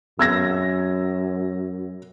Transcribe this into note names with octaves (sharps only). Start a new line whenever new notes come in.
F#2 E6 G#6 A#6